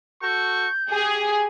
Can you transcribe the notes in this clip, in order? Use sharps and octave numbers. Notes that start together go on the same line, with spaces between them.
F#4 A4 C#6 G6
G4 G#4 G#5